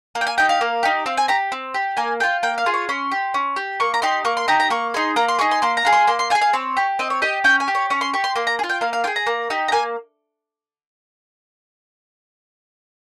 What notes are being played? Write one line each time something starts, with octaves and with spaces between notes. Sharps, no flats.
A#3
G5
G#5
D#4 G4 G5
F5
A#3
D#4 G4
C4 F5
G#5
G4 A#5
C4
G4
A#3 G#5
F4 G#4 G5
A#3 G5
F5
F4 G#4
C#5
C#4 C6
G4
C#4
G4
A#3 C#6
A#5
D#4 G4 C6
A#3 C#6
C6
D#4 G4 A#5
A#5
A#3 C#6
D#4 G#4 C6
A#3 A#5
C6
D#4 G#4 C#6
C6
A#3 C6
A#5
F4 G#4
C6
A#3 C6
C6
F4 G#5
G#4
F5
C4 C#5
G4
C4 D#5
C#5
G4 D#5
C#4 G5
G#5
G4
C#5
C#4 C#5
C6
G4 C#6
C6
A#3 C6
A#5
G#4
F4
G5
A#3 F5
F5
F4 G5
G#4
A#5
A#3
D#4 G4
A#5
A#3 G#5